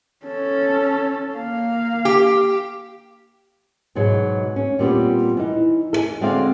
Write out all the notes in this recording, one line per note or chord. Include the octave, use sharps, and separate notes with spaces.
C#4 A4
A#3 F5
G4
G#2 B2 F#3 G#3
C#4
A#2 G3 B3 C4
E3 D#4
A4 G#5
D3 G#3 C4 F#4 D5 F5